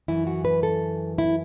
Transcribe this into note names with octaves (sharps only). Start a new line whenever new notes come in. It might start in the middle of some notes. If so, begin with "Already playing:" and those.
F#2 E3 E4
F#4
B4
A4
E4